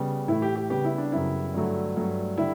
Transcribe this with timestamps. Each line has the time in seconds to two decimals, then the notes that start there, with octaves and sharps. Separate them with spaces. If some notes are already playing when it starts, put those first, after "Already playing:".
Already playing: C#3 G3 B3
0.28 A2 E3 A3 E4
0.42 G4
0.56 G4
0.70 C#3 G3 B3 G4
0.85 E4
0.98 D4
1.12 F#2 C#3 G3 B3 E4
1.54 G2 D3 F#3 A3
1.96 G2 F#3 A3
2.38 D3 G3 E4